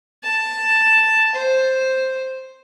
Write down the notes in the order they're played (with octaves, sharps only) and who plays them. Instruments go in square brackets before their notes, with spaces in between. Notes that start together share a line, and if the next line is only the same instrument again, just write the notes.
[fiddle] A5
C5